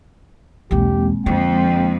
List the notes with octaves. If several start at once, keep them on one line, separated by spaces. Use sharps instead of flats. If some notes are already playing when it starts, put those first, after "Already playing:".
B1 E2 G#3 A#3 C4 G4
F2 D3 G5